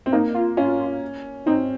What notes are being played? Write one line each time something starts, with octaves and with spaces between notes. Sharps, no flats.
C4
A#3 D#4
F4
C#4 F4
C4 D#4